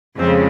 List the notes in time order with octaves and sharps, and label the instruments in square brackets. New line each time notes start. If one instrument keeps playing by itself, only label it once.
[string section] F2 C#3 G#3 C4